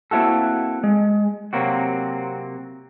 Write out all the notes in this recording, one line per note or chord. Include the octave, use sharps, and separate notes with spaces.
A#3 C4 E4 F#4 A4
G#3
C3 F#3 A#3 C4 F#4